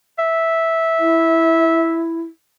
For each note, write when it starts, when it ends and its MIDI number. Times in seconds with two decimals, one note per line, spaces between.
0.18 2.11 76
0.99 2.21 64